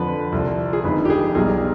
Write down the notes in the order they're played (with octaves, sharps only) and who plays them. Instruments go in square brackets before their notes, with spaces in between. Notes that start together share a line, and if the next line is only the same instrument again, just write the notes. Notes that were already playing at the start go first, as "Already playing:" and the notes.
Already playing: [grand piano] F2 D3 F3 B4
C2 C3 F3
G#4
G1 F2 D#3 G#3 B4
G4
G#4
B1 B2 G3 G#4